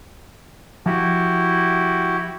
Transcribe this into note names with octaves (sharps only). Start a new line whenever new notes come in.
F3 E4 F#4 G4